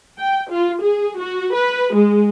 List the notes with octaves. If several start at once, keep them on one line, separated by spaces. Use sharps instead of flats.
G5
F4
G#4
F#4
B4
G#3